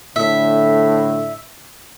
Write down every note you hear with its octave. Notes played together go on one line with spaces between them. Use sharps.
A2 D3 E5